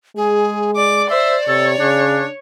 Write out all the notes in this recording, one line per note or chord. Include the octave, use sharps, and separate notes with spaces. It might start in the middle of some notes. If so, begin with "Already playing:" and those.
G#3 G#4
D5 D6
C5 E5
C3 A4 C#5
C#3 D4